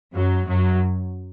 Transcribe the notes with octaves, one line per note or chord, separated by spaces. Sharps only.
F#2 F#3
F#2 F#3